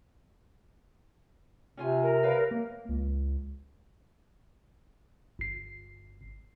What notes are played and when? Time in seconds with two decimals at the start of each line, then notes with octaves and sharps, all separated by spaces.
1.77 C3 C#4 F4 G#5
2.03 A#4
2.23 C#3 B4 F5
2.51 A#3
2.89 C#2
5.39 G1 C7